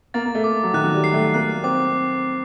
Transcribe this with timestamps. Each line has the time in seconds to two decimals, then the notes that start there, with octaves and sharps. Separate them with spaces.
0.14 A#3 A6
0.26 A#3
0.35 A3
0.44 D6
0.63 F#3
0.73 D#3 F#6
0.83 F#3
0.94 G3
1.04 C7
1.13 A3
1.34 A#3 F#6
1.64 C4 D6